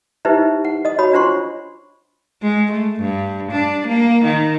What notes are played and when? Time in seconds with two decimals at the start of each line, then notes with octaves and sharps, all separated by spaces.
0.25 D#4 E4 G4 B4 C5 E5
0.65 F#5
0.85 D#5 D#6
0.98 F#4 C#5 B5 D#6
1.13 D4 F4 C5 F#5 C6 C#6
2.42 G#3
2.72 A3
3.00 G2
3.51 D4
3.87 A#3
4.24 D#3